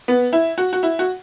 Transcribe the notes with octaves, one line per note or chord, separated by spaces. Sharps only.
B3
E4
F#4
F#4
E4
F#4